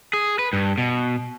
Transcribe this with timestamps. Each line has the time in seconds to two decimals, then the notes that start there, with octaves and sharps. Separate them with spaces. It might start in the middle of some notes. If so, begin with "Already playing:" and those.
0.13 G#4
0.39 B4
0.53 G2
0.78 B2